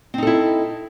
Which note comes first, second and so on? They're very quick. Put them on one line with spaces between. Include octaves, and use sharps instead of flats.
C4 D#4 A4 E4